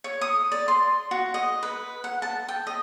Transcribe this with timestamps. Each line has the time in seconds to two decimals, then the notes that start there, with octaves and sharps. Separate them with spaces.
0.04 C#5
0.21 D#6
0.52 D5
0.68 C6
1.11 F#4
1.34 D#5
1.63 B4
2.04 F#5
2.22 A5
2.48 G5
2.67 D#5